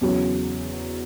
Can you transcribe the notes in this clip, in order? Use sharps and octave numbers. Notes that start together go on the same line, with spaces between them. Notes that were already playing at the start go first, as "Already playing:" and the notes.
E2 C#3 F#3